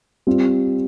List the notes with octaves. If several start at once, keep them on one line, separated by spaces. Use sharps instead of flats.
G3 C4 F4